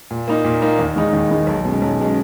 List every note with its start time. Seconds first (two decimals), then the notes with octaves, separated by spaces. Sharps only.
0.11 A#2
0.28 A#3 D#4
0.44 A#2
0.62 A#3 D#4
0.79 D#2
0.96 D#3 G#3 D#4
1.13 D#2
1.31 D#3 G#3 D#4
1.47 B1
1.65 B2 G#3 C#4
1.82 B1
1.99 B2 G#3 C#4